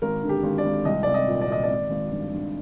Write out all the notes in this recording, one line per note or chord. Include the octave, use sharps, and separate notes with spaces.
G#1 A#4
D3
G4
G#1
D5
G#1
C2 D#5
C2 D5
D#5
A#2
D5
A#2 D#5
D5
G#1
G#1
G2
G2